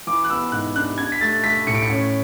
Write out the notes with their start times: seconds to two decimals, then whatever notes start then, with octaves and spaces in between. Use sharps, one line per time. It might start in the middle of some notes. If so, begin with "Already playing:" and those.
0.07 E3 D6
0.24 F#6
0.29 B3 E6
0.52 G#2 F#6
0.75 D4 F#6
0.98 D4 G#6
1.12 B6
1.21 A3 A6
1.44 A3 B6
1.67 A2 C#7
1.75 D7
1.82 C#7
1.90 C#4